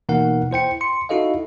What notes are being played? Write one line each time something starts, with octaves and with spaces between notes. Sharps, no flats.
B2 E3 A#3 D#4 A#4 F#5
E4 C5 G5 C#7
C6 C#7
D#4 E4 F#4 A4 D#5 F5